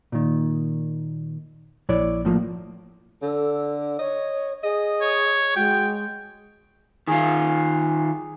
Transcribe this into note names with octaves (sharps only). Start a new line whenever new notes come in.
A#2 D#3
A#1 E4 C#5 D5
A2 F3 A#3
D3 A4
C#5 D#5
G#4 D#5
C#5
G#3 F#4 G5
D#3 F4 G#4